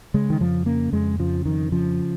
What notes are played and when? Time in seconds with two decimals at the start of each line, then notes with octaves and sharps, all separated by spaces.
0.14 C#3 G#3
0.30 D#3
0.40 F2 F3
0.66 C#3 A#3
0.93 F2 G#3
1.19 C#3 F3
1.45 F2 D#3
1.72 C#3 F3